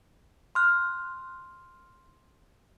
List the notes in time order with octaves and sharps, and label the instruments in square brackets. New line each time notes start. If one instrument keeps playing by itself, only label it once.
[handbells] C6 F6 F#6